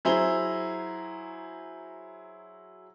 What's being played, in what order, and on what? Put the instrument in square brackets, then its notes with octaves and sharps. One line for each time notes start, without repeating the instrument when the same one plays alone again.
[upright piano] F#3 E4 G#4 C5 A#5 G7